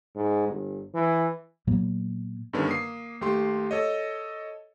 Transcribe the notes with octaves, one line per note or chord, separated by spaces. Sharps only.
G#2
G1
E3
A#2 F#3 A#3 B3
G2 D3 D#3 B3 C#4
A#3 D#6 C7
D#2 A3 G4 C6
A4 C#5 D#5